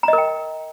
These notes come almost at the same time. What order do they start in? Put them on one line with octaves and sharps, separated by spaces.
A#5 D#5 A#4 G5